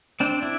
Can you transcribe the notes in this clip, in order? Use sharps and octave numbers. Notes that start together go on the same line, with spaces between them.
C4 D4
D4 E4